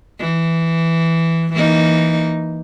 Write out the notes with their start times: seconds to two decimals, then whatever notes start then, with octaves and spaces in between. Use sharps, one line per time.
0.20 E3
1.53 E3 A#3 D#4